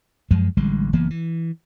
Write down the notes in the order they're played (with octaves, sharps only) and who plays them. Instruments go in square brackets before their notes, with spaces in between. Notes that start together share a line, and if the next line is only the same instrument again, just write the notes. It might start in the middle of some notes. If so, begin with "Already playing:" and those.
[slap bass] F#2 F3 G#3
A1 D3 G3 G#3
F#1 E3 A#3 B3
E3